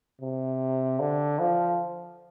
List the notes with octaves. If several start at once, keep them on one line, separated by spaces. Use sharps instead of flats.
C3
D3
F3